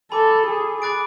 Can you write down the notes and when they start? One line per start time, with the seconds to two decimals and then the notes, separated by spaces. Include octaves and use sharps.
0.12 A4 G#5 B5 D6
0.47 G#4
0.82 B5 D6 F#6 A6 D7